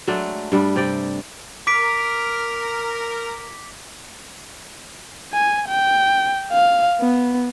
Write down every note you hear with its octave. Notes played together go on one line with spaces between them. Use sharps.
F#3 G#3 A3 D4
G2 G3 D4
C3 G4 D5 G5
A#4 D6 B6 D7
G#5
G5
F5
B3